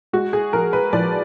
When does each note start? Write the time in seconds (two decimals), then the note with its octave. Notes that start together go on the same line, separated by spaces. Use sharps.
0.13 G#3 F#4
0.33 G#4
0.53 F3 A#4
0.73 B4
0.93 F3 D5